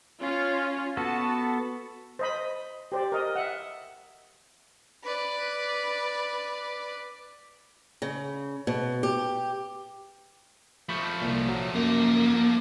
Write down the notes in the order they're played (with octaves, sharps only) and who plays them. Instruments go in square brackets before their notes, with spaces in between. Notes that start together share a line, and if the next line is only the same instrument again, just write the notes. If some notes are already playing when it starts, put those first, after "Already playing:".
[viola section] C#4 F4
[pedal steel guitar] B3 F#4 A4 [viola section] A5
[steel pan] C5 D#5 B5
G4 C5 D5
A#4 D#5
E5 F#5
[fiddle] B4 D5
[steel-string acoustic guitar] C#3
B2
G4
[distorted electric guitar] F3 A3 [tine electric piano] B5 C#6 G6
[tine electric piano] C2 A#2
F#3
[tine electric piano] F#2 [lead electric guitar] A#3